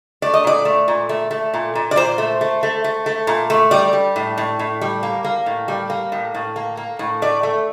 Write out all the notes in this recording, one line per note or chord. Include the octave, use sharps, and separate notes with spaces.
A3 D5
D#5
A#2 D5
A3
A#2
A3
A3
A#2
A#2
D5
A#2 C5
A3
A3
A3
A3
A3
A#2
A3
G3 D5
G3
A2
A2
A2
G3
A#3
A#3
A2
G3
A#3
A2
A2
A#3
A#3
A2
A3 D5
A3